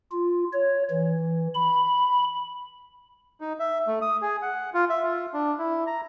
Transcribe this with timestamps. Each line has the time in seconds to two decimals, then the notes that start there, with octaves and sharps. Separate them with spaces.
0.11 F4
0.53 C#5
0.90 E3
1.54 B5
3.41 D#4
3.60 E5
3.87 A3
4.02 D#6
4.22 G#4
4.42 F#5
4.74 F4
4.90 E5
5.03 F4
5.33 D4
5.59 E4
5.87 A#5